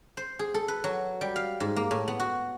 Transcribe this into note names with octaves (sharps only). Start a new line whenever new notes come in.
C5
G#4
A4
B4
F#3
G3
F5
G#2
A#3
A2
B3
F#4